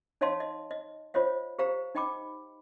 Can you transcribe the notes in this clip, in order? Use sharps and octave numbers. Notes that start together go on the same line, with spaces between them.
D#4 C#5 D#5 F5 A5 C6
D#5
D#5
F4 C5 C#5 D#5 F5
G4 C5 F5 A#5
D#4 D#5 G5 B5 D6